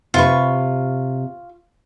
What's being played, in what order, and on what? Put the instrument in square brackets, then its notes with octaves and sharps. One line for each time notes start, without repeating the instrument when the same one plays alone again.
[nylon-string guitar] C3 G4 B4 [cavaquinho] F4 C#6